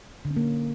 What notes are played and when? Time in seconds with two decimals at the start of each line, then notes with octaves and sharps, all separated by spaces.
0.25 D3
0.31 C#4
0.36 A#3